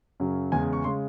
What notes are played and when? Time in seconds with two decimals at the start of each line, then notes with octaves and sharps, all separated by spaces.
0.20 F#2 C#3 F#3
0.52 E2 C#3 G#3 G#5
0.73 C#6
0.84 C#3 G#3 C6